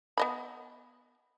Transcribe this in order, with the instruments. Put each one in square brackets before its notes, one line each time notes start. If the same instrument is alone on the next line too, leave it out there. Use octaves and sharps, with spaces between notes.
[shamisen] B3 D#5 B5